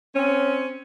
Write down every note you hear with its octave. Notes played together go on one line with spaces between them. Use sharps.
C4 C#4